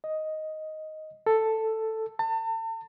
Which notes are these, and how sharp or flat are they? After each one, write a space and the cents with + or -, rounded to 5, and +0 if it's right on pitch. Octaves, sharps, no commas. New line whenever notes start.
D#5 +5
A4 +5
A5 +40